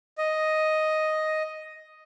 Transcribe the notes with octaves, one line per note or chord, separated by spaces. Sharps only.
D#5